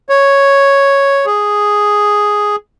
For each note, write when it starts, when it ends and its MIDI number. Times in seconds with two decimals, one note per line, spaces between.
0.09 1.26 73
1.26 2.56 68